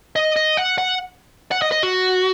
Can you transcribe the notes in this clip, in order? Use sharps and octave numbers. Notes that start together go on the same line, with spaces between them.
D#5
D#5
F#5
F#5
F#5
D#5
D#5
F#4